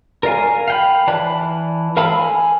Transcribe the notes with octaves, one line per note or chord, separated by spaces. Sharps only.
A#4 D5 F5 G#5
F5 G5 B5
E3 D5 A5 B5 F#6
A#4 F5 A5 B5 E6
G#5